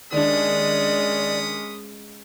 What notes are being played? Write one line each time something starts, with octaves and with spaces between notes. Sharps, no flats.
D#2 G#3 C#4 D4 D5 B5 C#6 D#6